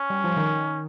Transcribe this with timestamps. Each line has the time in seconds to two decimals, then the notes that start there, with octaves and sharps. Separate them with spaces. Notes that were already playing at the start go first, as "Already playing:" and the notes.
Already playing: C#4
0.10 G3
0.24 F3
0.37 D#3